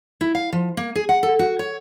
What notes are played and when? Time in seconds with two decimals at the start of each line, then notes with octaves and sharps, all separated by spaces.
0.21 E4
0.35 F5
0.53 F3
0.77 A#3
0.95 G#4
1.09 F#5
1.23 A4
1.39 F#4
1.59 C#5